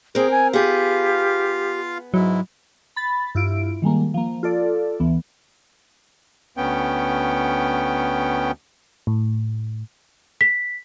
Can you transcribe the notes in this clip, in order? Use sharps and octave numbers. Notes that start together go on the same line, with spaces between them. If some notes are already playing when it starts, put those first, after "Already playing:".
C4 G#4 A#4
G#5
B3 F4 G4 G#4 F5
G#2 F#3 G#3 E4
B5 A6
G2 E4 F4 D7
D#3 G3 G#3 A#3
F3 A#3
F4 A4 D5
D2 E3 B3
D2 B3 C#4 G5
A2
B6